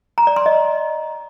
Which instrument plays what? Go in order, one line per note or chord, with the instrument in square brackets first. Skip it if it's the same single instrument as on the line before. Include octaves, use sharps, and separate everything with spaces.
[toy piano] A#5
D5
C6
D#5